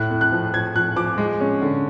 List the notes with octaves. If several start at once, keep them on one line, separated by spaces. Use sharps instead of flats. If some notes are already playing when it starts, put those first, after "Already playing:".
Already playing: A2 F#6
A2
F#6
F3
F3 G#6
F3 F#6
F3 D6
G#3
C#4
D3